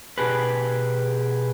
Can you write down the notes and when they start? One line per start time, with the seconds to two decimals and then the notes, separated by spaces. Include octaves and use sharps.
0.18 B2 G4 G#4 B4